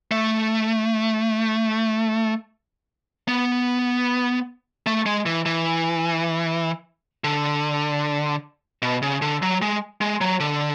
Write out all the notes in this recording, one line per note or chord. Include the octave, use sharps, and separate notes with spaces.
A3
B3
A3
G#3
E3
E3
D3
B2
C#3
D3
F#3
G#3
G#3
F#3
D3